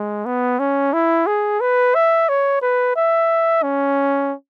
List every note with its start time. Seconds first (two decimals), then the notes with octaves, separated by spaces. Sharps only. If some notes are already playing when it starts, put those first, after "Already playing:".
Already playing: G#3
0.26 B3
0.59 C#4
0.93 E4
1.27 G#4
1.61 B4
1.95 E5
2.29 C#5
2.62 B4
2.96 E5
3.63 C#4